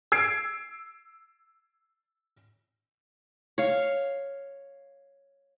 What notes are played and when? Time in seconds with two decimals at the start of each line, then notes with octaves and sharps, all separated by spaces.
0.12 E6 G#6 C7 D7
3.58 C#5 F5